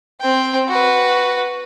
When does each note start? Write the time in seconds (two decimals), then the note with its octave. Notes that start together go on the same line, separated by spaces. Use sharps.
0.21 C4 G5
0.68 F#4 B4